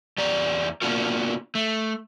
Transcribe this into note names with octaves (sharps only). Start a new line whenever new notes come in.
E2 G4 D5 A#5
A#3 B3 D4 F4 F#4 A#4
A3